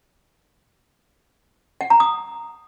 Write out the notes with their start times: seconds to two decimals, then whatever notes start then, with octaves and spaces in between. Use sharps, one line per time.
1.81 F#5
1.90 A#5
2.00 D#6